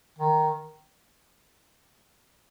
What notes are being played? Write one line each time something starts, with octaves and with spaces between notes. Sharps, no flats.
D#3